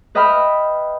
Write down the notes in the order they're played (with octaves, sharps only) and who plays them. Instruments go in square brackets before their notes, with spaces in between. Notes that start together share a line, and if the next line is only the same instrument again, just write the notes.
[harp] B4 D#5 E5 G5 B5 F6